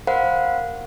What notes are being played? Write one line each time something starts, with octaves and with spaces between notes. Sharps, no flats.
A#4 C5 F5 F#5 B5